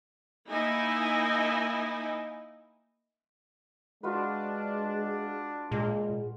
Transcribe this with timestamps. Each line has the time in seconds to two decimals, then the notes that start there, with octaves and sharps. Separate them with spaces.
0.47 A#3 D#4 E4 D#5 G#5
4.03 G#3 D4 F4 F#4 B4
5.72 A#2 G#3